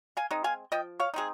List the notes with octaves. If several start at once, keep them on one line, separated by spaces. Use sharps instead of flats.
F5 G#5
G#3 C4 D#4
F5 G#5
F3 D#5 G5
C#5 F5
G#3 C4 D#4 G#4